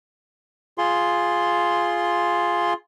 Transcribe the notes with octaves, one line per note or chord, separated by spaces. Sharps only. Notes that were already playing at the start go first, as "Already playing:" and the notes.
F4 G#4 C6